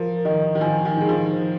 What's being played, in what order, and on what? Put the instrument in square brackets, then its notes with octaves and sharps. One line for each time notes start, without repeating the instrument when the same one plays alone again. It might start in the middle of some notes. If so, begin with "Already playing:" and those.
Already playing: [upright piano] F3 [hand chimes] A#4
[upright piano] D#3 [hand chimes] D#5
[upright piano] D#3
[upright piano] F3 [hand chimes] G#5
[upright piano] D#3
[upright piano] G#3 [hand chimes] D#4
[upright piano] F3
[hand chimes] C5